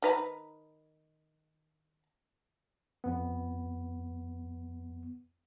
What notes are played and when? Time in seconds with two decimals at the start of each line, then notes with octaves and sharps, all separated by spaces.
0.02 D#3 B4 A#5
3.04 F2 B3